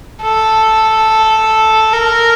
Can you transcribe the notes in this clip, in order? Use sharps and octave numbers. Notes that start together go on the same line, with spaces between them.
A4
A#4